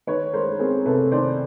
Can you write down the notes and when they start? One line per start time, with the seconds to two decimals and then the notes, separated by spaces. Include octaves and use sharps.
0.07 D#3 B4 C#5
0.33 G#3 A#4 C5
0.59 C4 G#4 A#4
0.86 C3 A4 B4
1.12 D#3 C5 D5